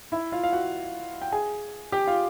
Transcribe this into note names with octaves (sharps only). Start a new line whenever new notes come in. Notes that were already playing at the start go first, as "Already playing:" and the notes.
E4 E5
F4 F5
F5
F#4 F#5
G5
G#4 G#5
G4 G5
F4 F5